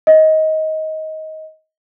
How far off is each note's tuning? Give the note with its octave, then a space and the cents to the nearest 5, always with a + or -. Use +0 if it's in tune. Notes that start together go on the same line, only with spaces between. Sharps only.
D#5 +20